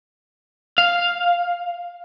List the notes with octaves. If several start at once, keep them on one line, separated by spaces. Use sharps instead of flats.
F5